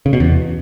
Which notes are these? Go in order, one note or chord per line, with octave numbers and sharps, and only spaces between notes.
C#3
B2
E2